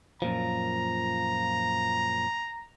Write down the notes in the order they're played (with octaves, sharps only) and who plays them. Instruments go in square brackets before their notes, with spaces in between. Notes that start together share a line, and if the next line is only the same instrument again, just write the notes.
[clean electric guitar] F#2 A#2 F3 [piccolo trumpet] A#5